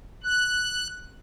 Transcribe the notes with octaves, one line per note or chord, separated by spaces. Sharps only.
F#6